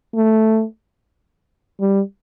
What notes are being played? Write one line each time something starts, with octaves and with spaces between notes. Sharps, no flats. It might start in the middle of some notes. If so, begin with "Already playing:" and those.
A3
G3